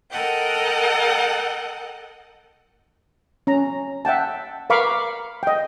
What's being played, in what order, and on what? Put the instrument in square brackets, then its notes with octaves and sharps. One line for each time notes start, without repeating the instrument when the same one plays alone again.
[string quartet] A4 A#4 D#5 F#5 G5
[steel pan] C#4 A#5
E5 F#5 G5 A5
A#4 B4 F5 B5 C#6 D6
D#5 G5